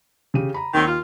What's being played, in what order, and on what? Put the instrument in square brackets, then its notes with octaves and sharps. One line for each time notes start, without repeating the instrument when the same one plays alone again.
[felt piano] C#3 G4 D#7
A#5 B5
[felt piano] D#2 [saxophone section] D#3 F#3 C4
[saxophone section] F4